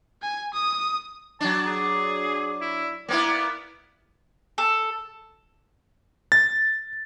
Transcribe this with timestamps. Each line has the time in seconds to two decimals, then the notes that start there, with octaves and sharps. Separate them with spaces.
0.22 G#5
0.54 D#6
1.41 F#3 D4 A5
1.66 G#4
2.61 E4
3.09 A#3 B3 E4 D5
4.58 A4
6.32 A6